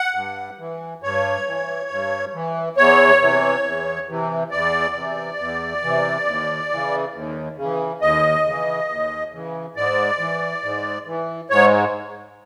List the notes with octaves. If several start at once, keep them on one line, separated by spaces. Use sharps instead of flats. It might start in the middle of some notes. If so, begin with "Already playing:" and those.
Already playing: F#5
G2
E3
G2 C#5
E3
G2
E3
E2 C#5
C3 E3
E2
C3 E3
E2 D5
C3 E3
E2
C3 E3
D#2
C#3 E3
D#2
C#3
E3
D#2 D#5
C#3 E3
D#2
C#3 E3
G#2 D5
E3
G#2
E3
G#2 C#5